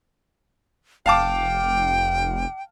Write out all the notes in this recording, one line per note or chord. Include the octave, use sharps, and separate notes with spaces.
F1 F5 G5 A5 D6